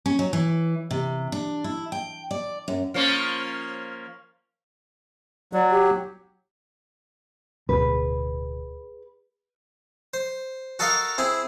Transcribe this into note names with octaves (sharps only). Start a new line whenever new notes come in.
C#4
F#3
E3
C3
D4
E4
G5
D5
F#2
F3 A#3 C#4
F#3 D5
G4
D1 D2 B2 G#4 B4
C5
F#4 A4 A#4 D#5 F5
C4 E4 G#4 G#5